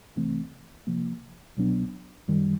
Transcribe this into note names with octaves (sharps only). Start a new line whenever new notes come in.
C2 C3 E3 A3 C4
C3 F3 A#3
C2 B2 F#3 B3 D4
F#2 D#3 G3